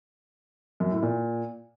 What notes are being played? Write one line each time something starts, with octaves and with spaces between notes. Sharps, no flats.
F#2
A2
A#2